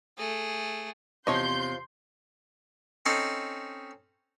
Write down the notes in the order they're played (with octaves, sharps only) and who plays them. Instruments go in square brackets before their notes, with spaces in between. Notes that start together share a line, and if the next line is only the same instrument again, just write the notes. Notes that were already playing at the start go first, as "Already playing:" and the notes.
[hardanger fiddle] A3 G#4
[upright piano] E2 C3 [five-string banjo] F3 C#5 D#5 [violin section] C6 G6
[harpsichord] C4 C#4 D#4 A4